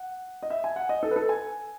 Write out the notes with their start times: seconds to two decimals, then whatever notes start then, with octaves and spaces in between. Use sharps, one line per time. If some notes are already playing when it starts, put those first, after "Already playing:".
Already playing: F#5
0.43 D#5
0.50 E5
0.64 G#5
0.76 F#5
0.89 D#5
1.03 A4
1.11 B4
1.16 A4
1.29 G#5